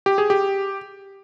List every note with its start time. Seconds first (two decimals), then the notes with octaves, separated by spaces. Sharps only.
0.06 G4
0.18 G#4
0.30 G4